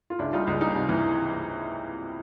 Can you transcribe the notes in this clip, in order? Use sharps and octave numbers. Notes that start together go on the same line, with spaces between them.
F4
C#2 D4 E4
G3 D#4 F4
C#2 D#4
G3 D#4
C3
E3